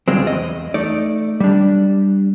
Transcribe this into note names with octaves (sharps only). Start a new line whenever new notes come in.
C#2 C#3 G3 G#3 C4
E2 D#5
A3 D#4 D5
G3 D4